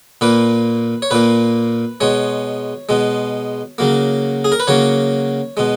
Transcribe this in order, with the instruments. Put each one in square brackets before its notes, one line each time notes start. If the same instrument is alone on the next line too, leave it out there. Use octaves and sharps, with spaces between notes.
[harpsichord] A#2 A#3 B4
C#5
A#2 A#3 B4
B2 G#3 C#5
B2 G#3
C#3 F#3 A#3
G#4
A#4
B4
C#3 F#3 A#3 C#5
B2 G#3